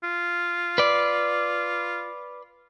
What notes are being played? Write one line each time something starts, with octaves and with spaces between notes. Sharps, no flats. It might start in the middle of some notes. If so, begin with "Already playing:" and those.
F4
B4 D5